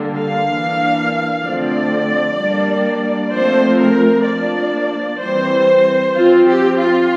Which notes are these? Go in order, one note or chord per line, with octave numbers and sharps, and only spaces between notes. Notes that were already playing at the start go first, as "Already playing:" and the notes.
Already playing: D3 G3 A#3
F5
E3 A#3 D4
D3 F3 A3 C4 D5
G3 A#3 D4
F3 A3 C4 C5
A#4
F3 A#3 D4 D5
E3 G3 C4 C5
F3 C4 F4
G4
F4